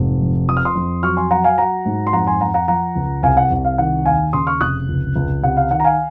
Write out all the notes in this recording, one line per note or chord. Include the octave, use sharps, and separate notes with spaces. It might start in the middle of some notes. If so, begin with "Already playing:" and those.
Already playing: F1 G#2
F2
F3 D#6
F6
C6 D#6
F2
F#3 C#6 F6
G#5 C6
F#3 F#5 A#5
F5 G#5
F#3 F#5 A#5
G#2
C6
F2 F#5 A#5
G#5 C6
F2 F#5 A#5
F#5 A#5
F3 F#5 A#5
C#2
C2 F5 G#5
F#5
C2
F5
D#3 F#5
D#2 F5 G#5
C#3 C6 D#6
C#6 F6
F1 D#6 F#6
C#2
C#2
C3 F#5
F5
D#3 F#5
A#5
F5 G#5